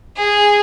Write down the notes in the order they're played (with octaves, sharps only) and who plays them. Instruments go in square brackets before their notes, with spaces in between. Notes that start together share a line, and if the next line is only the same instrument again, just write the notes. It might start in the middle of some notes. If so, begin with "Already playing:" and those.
[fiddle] G#4